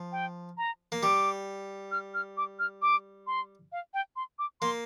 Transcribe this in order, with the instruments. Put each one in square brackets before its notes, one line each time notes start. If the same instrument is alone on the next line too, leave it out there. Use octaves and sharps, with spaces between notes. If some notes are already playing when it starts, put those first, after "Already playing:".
Already playing: [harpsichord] F3
[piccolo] G5
A#5
[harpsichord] A#3
[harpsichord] G3 [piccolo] D6
[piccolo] F6
F6
D6
F6
D6
C6
F5
G5
C6
D6
[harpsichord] A#3 [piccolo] C6